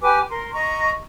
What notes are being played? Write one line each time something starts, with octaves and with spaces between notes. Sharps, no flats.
G4 B4 G#5 D6
A#4 C6
D#5 A#5 C#6